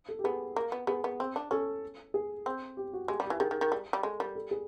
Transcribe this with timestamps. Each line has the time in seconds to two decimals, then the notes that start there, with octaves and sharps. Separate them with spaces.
0.09 A4
0.19 G4
0.24 B3 G#4
0.56 A#3
0.72 B3
0.87 B3 G#4
1.04 B3
1.20 C4
1.36 D4
1.51 C#4 A4
2.14 G#4
2.46 C4
2.77 G4
2.93 F#4
3.08 G#3 G4
3.20 G3
3.25 G4
3.30 E3
3.40 D#3 G#4
3.51 D#3
3.61 D#3
3.72 G3
3.93 G3
4.03 G#3 A4
4.19 G3 A#4
4.35 A4
4.51 G#4